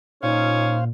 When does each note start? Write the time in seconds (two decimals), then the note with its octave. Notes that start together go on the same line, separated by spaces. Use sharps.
0.23 A#2 C#4 D#4 C5 F5